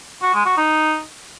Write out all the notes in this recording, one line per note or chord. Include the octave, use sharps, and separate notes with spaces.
F#4
G#3
F#4
D#4